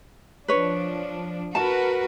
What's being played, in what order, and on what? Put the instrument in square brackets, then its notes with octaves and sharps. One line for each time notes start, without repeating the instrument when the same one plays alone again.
[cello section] F3 D4 [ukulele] B4 C#5
[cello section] F#4 A#4 B4 [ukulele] A5